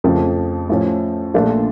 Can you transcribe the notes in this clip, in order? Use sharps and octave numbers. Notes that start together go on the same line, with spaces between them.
F2 C#3 F3 A3
A2 F3 C#4
A#1 A#2 A3 D4 F4